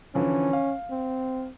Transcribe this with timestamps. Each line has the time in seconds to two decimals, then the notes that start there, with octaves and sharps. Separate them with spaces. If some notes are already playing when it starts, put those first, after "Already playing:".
0.15 D3 E3 F3 C#4
0.53 F5
0.90 C4